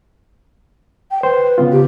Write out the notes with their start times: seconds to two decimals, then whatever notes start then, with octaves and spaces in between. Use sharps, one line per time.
1.11 G5
1.23 B4 C5
1.58 C#3 B3 F4
1.72 G4